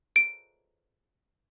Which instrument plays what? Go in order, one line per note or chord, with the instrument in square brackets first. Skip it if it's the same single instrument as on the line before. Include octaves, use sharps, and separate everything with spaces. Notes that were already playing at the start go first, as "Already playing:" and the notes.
[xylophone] D7